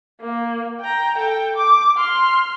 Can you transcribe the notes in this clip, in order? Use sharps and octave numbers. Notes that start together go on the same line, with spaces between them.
A#3
G5 A#5
A4 G5
D6
C6 F6